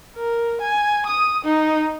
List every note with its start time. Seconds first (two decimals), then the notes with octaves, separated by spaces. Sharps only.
0.16 A#4
0.61 G#5
1.06 D#6
1.44 D#4